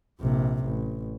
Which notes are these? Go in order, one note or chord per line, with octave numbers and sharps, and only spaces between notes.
A#1 C3
A1